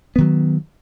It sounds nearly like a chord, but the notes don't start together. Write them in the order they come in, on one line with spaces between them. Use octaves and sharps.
B3 D#3 F#3